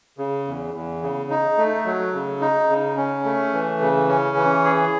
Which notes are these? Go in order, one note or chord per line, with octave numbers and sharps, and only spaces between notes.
C#3
E2
E2
C#3
D#4
A3
F#3
C#3
D#4
C#3
C#4
A3
E3
C#3
C#4
E3
G#4